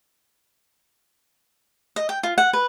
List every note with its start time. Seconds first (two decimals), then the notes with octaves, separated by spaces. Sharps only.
1.96 D#5
2.09 G5
2.23 F4
2.38 F#5
2.53 B4